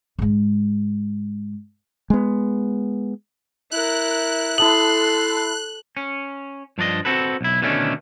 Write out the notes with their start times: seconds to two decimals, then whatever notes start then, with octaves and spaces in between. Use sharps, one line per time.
0.19 G#2 G#3
2.10 G#3 B3
3.71 E4 A#4 F#6
4.58 E4 A4 A5 C6 D#6 F#7
5.97 C#4
6.78 G2 F3 D4 D5 D#5
7.05 C4 F#4 A4 B4
7.41 B1 E4
7.62 B2 D3 D#3 A3 C#4 D4